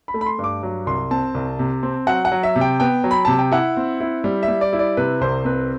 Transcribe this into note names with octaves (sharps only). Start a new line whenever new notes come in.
B5
A3
B5
C6
G2
D6
F#3
C2 C6
C4 A5
C2
C3
C4
F#3 F#5
F#5
F#3
E5
C3
G5
B3 G5
F#3
B5
C3 A5
G5
E4 F#5
C4
E4
G3
E5
G3
D5
E4
D5
C3 B4
C2 C5
C4 B4